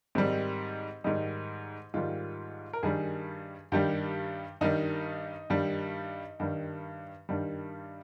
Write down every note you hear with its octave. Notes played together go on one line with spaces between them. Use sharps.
G#2 D#3 G3 C4
G#2 D#3 G3 D#4
G#2 D#3 G3 F4
A#4
G2 D#3 G3 G#4
G2 D#3 G3 G4
G2 D#3 G3 D#4
G2 D#3 G3
G2 D#3 G3
G2 D#3 G3